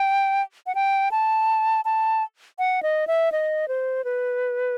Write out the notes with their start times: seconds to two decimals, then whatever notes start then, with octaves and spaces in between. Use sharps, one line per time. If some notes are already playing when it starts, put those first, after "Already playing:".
Already playing: G5
0.67 F#5
0.75 G5
1.11 A5
1.85 A5
2.59 F#5
2.83 D#5
3.07 E5
3.32 D#5
3.68 C5
4.04 B4